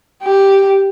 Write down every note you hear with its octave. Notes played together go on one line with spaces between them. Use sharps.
G4